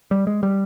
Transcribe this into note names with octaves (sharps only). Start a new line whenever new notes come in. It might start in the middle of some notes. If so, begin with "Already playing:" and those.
G3
G#3
G3